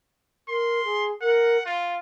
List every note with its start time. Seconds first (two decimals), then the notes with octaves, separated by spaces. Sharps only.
0.48 A#4 C6
0.84 G#4
1.21 A#4 F#5
1.66 F4 F5